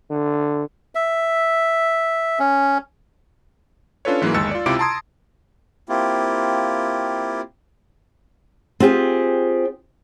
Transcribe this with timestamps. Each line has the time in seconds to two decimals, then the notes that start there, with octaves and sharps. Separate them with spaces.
0.10 D3
0.95 E5
2.39 C#4
4.05 C#4 D4 F4 A4 B4 C#5
4.22 G#2 E3 F#3 G#3 A#3
4.34 G1 D#2 G#3 E6 A6 C#7
4.51 F4 D5
4.66 C#2 C3 E4 F4 D6 D7
4.79 A5 A#5 C6 D#6 G#6
5.89 A#3 C4 E4 F4 G4
8.80 C4 F4 G4 G#4